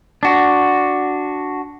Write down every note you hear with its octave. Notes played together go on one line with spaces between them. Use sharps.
D4 F#4